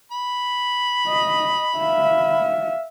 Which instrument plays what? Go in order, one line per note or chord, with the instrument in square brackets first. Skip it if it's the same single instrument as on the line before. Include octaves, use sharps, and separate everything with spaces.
[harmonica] B5
[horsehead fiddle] D#5
E5 F5